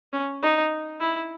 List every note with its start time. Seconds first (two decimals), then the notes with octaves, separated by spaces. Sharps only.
0.13 C#4
0.43 D#4
1.00 E4